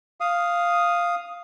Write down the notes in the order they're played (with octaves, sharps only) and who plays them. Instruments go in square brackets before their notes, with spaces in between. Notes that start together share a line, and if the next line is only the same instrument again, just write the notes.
[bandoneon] F5 D#6